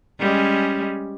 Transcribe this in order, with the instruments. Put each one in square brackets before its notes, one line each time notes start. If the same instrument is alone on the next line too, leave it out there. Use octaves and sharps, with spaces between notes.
[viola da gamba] G3 G#3 C#4